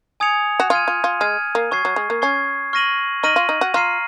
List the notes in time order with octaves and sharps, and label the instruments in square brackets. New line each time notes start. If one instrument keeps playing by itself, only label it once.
[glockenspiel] G#5 D#6 G#6 C#7 F7
[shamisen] F#4
[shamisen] F4 [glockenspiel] F6 G#6 D#7
[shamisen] F4
F4
[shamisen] G#3 [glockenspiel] F6 G#6 D#7
[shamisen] A#3
[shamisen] F#3 [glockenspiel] C#6 G#6 C7
[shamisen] F#3
G#3
A#3
[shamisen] C#4 [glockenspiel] C#6 G#6 C7
[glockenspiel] C#6 F6 A#6 D#7 F#7
[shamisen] D#4 [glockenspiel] C#6 F6 A#6 D#7 F#7
[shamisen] F4
D#4
F#4
[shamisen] F4 [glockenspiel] A#5 F6 C7 D#7